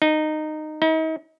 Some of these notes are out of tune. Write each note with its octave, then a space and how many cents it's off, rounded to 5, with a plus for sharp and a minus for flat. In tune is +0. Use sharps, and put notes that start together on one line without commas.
D#4 -15
D#4 +40